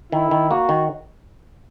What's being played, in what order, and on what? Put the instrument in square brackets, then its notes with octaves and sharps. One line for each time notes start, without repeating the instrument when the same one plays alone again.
[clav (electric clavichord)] D#3 [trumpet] E4
[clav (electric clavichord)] D#3
[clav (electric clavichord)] A#3 [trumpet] F#4
[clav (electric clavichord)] D#3